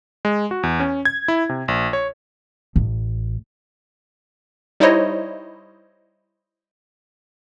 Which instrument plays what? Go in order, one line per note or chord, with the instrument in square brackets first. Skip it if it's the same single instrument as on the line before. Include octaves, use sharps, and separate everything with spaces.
[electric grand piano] G#3
F#4
E2
C#4
G#6
E4
C3
A#1
C#5
[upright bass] A1
[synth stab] G3 D#4 E4 C5 C#5 D#5